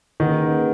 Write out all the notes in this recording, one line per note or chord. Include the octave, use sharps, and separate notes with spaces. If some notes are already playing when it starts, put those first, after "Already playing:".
D#3 A#3 C#4 G#4 B4 F#5